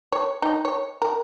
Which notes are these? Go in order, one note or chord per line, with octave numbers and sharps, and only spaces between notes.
C#5
D#4
C#5
A#4